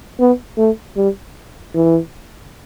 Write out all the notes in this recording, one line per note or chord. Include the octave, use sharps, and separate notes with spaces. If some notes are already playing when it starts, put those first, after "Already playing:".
B3
A3
G3
E3